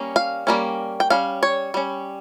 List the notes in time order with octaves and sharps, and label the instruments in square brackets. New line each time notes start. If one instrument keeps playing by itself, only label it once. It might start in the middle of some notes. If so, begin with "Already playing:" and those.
Already playing: [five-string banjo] G3 A#3 C#4
F5
G3 A#3 C#4
G5
G3 C#4 F5
C#5
G3 C#4